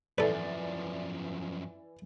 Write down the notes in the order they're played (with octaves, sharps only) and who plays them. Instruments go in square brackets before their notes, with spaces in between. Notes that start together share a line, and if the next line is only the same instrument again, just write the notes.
[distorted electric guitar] F#2 F3 [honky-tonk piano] E3 D5 [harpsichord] A4 B4